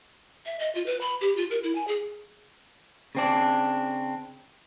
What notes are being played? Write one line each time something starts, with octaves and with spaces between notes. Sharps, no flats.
E5
D#5
F4
B4
B5
G4
F4
A#4
E4
G#5
G#4
C#3 C4 D4